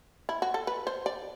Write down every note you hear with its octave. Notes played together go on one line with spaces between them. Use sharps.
E4
F#4
A4
B4
C5
D5